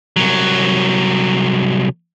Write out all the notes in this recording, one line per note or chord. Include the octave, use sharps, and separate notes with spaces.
C2 F#3